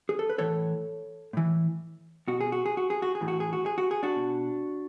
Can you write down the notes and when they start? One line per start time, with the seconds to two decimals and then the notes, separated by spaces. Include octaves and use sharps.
0.09 G#4
0.19 A4
0.30 B4
0.38 A2 E3 A4 C#5
1.33 A2 E3
2.28 B2 F#4
2.41 G#4
2.52 F#4
2.66 G#4
2.77 F#4
2.90 G#4
3.02 F#4
3.15 G#4
3.21 A2 E3
3.28 F#4
3.40 G#4
3.53 F#4
3.66 G#4
3.78 F#4
3.91 G#4
4.03 D4 F#4
4.16 B2